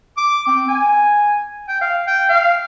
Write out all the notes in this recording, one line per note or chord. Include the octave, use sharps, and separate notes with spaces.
D6
C4
G#5
G5
F5
G5
F5